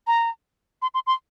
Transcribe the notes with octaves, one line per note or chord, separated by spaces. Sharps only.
A#5
C6
C6
C6